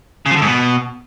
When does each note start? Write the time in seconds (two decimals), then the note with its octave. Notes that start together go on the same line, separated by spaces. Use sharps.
0.26 C#3
0.31 F3
0.36 D3
0.41 G#2
0.47 B2